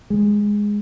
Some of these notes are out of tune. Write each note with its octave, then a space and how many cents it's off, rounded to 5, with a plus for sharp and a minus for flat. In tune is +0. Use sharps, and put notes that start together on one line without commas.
G#3 -5